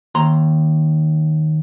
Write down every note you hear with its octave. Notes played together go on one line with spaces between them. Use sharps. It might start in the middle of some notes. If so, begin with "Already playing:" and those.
D#2 A#5 C6